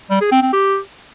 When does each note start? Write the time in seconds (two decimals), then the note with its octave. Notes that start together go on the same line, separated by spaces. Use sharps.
0.10 G3
0.21 G#4
0.32 C4
0.42 C4
0.53 G4